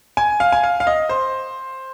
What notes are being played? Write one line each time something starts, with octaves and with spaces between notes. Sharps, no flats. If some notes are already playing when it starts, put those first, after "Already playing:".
G#5
F5
G#5
F5
F5
D#5
C5